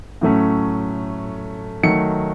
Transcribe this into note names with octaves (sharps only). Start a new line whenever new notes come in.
A2 F#3 A3 C#4
D#3 F#3 A3 C#7